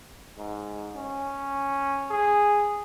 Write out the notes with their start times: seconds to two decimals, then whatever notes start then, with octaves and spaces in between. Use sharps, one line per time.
0.38 G#2
0.95 C#4
2.10 G#4